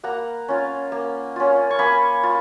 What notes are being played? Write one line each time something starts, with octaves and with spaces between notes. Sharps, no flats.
A#3 F#5 A#5
C#4 F4
A#3
C#4 F4
C#6
A#3 G#5 B5
F4